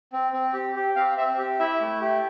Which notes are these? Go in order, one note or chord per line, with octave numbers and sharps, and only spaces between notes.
C4
C4
G4
G4
C4 F5
C4 E5
G4
E4 E5
A3
G4